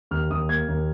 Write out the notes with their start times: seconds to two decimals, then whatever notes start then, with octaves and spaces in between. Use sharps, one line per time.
0.11 D#2 F6
0.31 D#2 D#6
0.49 A#3 G#6
0.68 D#2